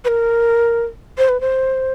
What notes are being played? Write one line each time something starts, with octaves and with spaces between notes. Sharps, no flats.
B4
A#4
C5
B4
C5